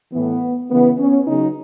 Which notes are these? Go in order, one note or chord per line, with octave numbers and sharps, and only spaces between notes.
A2 E3 B3
C#3 E3 B3
C#4
C#3 F#3 D#4